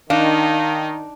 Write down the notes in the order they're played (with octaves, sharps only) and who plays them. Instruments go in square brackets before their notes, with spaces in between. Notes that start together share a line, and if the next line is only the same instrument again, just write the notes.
[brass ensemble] D#3 [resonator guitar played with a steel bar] D4 [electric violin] D#4 [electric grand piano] F5